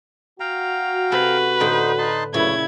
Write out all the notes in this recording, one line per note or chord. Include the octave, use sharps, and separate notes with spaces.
F#4 F5 G5 A#5
C3 A4 B4
A2 D3 D#4 C5 G5
D#4 A5 C6
F#2 A#2 C#3 A3 E4 B4 C#5 G#6